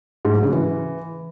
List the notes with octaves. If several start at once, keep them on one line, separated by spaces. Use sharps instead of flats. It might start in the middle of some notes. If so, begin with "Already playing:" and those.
G#2
F#3
C#3
E3